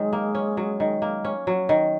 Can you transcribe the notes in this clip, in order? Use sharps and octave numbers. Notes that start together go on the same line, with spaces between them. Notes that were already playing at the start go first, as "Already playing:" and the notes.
Already playing: D#3 F#3 G#3
A#3
C#4
F#3
D#3
A#3
C#4
F#3
D#3